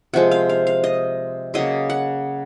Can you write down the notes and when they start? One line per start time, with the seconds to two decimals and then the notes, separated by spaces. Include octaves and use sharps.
0.13 C3 F3 G#3 F#5
0.31 F5
0.49 F5
0.67 F5
0.84 D#5
1.54 C#3 F#3 A#3 D#5
1.90 F#5